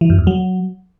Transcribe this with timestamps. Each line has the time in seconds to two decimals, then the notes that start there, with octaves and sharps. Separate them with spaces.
0.01 E3
0.10 F#2
0.18 E2
0.27 F#3